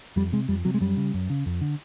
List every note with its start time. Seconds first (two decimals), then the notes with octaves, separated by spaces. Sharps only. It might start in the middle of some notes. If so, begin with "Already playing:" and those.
0.16 F2 G3
0.32 C3 G#3
0.48 F2 G3
0.65 C3 F#3
0.74 G#3
0.81 F#2 G3
0.97 C#3
1.14 F#2
1.30 C#3
1.46 F2
1.61 D3